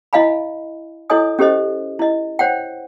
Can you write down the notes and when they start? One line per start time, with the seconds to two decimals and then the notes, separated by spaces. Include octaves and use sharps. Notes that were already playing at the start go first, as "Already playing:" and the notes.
0.13 E4 D#5 F5 G#5 B5
1.10 E4 A4 C#5 D#5 G#5 D#6
1.39 C#4 G4 A4 C5 D#5
1.99 E4 D#5
2.39 C5 C#5 F#5 G5